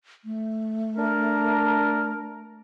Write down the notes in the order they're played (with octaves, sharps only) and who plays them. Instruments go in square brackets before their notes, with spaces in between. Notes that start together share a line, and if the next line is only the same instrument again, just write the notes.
[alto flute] A3
[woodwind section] D4 A#4